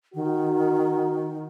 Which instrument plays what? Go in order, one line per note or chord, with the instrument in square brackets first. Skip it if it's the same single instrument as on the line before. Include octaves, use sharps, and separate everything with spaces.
[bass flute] D#3 [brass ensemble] F#4